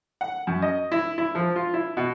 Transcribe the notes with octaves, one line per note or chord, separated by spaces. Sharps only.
F#5
F#2
D#5
E4
E4
F3
F4
E4
B2